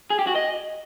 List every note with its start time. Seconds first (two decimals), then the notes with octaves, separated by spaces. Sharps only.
0.10 G#4
0.19 G4
0.27 F#4
0.35 D#5